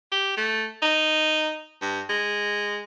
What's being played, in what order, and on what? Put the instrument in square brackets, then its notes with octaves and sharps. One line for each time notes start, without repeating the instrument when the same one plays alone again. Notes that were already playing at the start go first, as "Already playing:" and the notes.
[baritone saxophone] G4
A3
D#4
G2
G#3